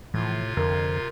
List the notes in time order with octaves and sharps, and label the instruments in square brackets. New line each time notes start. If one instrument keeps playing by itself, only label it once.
[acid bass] A2 [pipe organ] C3 F4 G#6 [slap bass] E3 F3
[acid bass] F2 [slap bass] D3 [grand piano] A#4